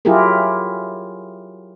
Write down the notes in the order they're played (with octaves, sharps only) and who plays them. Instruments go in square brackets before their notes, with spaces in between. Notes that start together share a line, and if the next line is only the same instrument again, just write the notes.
[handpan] F#3 E4 F4 G4 G#4 A#4